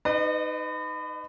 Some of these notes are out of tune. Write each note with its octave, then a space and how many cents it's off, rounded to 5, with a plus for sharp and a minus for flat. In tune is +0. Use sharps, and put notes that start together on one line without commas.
D#4 +0 B4 +30 D#5 -45